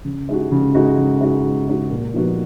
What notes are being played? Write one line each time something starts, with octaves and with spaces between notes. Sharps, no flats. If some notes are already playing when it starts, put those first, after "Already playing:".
C#3
G#3 D#4 F#4
C#3
G#3 D#4 F#4
C#3
G#3 D#4 F#4
C#3
G#3 D#4 F#4
A#2
F3 B3 D#4 F#4